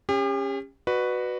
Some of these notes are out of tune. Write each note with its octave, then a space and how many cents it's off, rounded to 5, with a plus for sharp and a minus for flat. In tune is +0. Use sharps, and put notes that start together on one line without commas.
C#4 -10 G4 +40
F#4 +0 B4 +0 D5 +40